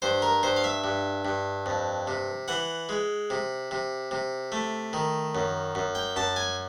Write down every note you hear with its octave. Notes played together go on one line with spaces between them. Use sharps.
G2 C5
A#4
G2 C5
F5
E5
G2
G2
F2
C3
E3 F#5
G#3
C3
C3
C3
A3
D#3
F#2
F#2
G5
F#2 A5
G#5